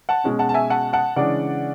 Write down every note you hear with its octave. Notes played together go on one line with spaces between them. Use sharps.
F#5 A5
B2 G#3 C#4
F#5 A5
A5
E5 G#5
F#5 A5
F#5 A5
C#3 E3 G#3 D4 D5 F#5